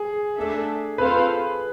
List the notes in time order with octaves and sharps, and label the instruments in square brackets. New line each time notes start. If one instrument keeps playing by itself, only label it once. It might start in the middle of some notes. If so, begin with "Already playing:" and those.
Already playing: [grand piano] G#4
[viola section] A3 D4 A4 E5
[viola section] C4 F4 A4 C5 F5 [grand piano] B4